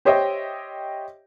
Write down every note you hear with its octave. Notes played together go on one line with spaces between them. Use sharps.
G4 C5 C#5 D#5 E5 G5